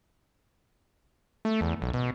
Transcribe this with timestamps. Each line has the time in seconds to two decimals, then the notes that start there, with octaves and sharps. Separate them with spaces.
1.45 A3
1.61 E2
1.82 B1
1.94 B2